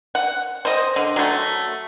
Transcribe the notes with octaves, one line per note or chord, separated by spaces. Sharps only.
F#5
C5 D#5
D3
F#3 A3